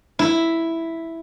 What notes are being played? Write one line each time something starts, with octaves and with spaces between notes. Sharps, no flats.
E4